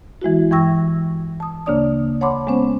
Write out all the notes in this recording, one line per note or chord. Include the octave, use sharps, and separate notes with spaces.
E3 G#3 E4 F#4
G2 E3 G5 C#6 E6 A#6
A5 D#6
D2 C#3 A#3 D4 D5 D#6
C#5 F#5 A5 B5 C6 D6
G#3 B3 C#4 C5